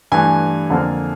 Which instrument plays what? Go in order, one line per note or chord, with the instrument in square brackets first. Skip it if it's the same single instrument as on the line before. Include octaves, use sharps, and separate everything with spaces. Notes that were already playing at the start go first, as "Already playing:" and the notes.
[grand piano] G2 E3 A3 G#5
F2 D3 F3 A#3